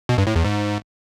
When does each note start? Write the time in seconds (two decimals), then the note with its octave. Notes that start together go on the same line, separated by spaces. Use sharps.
0.09 B2
0.18 G2
0.27 A2
0.36 E2
0.44 G#2